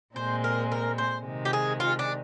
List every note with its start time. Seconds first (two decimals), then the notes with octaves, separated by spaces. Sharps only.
0.16 A#2 G#3 C4 C5
0.44 A#4
0.72 A#4
0.98 C5
1.26 C3 D#3 G#3
1.45 G4
1.53 G#4
1.80 F4
1.99 D4